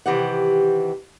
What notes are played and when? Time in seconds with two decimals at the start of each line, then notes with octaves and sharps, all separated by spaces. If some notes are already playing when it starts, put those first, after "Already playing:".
0.06 C3 D#3 E3 G4 F#5